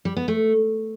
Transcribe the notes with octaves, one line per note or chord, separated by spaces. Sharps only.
G3
B3
A3